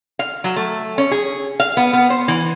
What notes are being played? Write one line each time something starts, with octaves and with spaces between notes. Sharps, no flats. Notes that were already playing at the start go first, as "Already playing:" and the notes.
F5
F#3
A3
C#4
G#4
F5
B3
B3
C5
E3